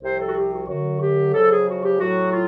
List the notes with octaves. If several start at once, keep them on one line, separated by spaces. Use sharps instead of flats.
C2 C3 F3 C5
A4
F#4
G4
F#4
F#2 D3 F#3 F#4
G4
F2 C#3 F#3 A4
G#4
F#4
G4
A2 F#3 F#4
F4